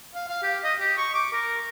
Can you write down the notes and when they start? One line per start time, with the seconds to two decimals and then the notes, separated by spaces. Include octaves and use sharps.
0.15 F5
0.29 F5
0.43 G4
0.64 D#5
0.79 G4
0.97 C#6
1.14 D6
1.33 A#4